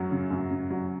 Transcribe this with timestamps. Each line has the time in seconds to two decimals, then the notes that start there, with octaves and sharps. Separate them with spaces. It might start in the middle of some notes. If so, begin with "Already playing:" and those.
Already playing: F#2 F#3
0.11 C#3
0.31 F#2
0.50 F#2
0.70 F#3